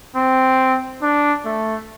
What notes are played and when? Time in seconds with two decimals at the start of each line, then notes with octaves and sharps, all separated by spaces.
0.15 C4
1.02 D4
1.45 A3